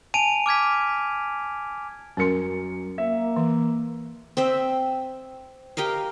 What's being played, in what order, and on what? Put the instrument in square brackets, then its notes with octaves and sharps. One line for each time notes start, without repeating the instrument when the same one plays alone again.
[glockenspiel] G#5 A5 D7 D#7 F7
D6 F6 G#6 B6
[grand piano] F#2 C#7 [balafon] C#4 A#4 C6
[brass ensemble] A#3 [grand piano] E5
[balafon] E3
[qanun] C4 D#5 E5
G4 A#4 D#5 F5